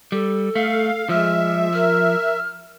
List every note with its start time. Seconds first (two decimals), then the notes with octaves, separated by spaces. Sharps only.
0.12 G3 A4
0.56 A3 F5
1.09 F3 G#3 E5 F6
1.73 A#4 F6